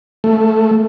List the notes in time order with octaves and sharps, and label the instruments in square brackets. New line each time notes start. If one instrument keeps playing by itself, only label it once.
[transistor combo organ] A3